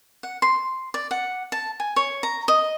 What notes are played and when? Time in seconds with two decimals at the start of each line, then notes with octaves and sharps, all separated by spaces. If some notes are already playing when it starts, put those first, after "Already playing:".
0.23 F#5
0.42 C6
0.94 D5
1.11 F#5
1.52 A5
1.80 G#5
1.96 C#5
2.23 A#5
2.48 D#5